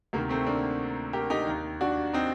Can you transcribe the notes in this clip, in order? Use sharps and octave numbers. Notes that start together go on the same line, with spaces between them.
D2 C3 D#3 A#3
A3 C4
A#3 D4
G4 A#4
D#4 G4
D#2 D#3
D4 F#4
C4 D#4